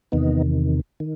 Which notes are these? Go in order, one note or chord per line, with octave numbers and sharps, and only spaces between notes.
E2 C3 D#3 B3 D#4
D#3